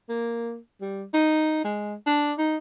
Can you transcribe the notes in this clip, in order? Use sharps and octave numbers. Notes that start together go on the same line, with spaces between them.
A#3
G3
D#4
G#3
D4
D#4